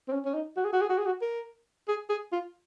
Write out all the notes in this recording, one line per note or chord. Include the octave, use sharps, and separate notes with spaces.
C4
C#4
C#4
D#4
F#4
G#4
F#4
G#4
F#4
G#4
F#4
A#4
G#4
G#4
F4